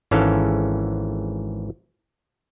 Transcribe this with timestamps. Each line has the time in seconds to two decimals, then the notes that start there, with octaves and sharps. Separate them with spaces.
0.11 G#1 G#2 E3 C#4 A4 F5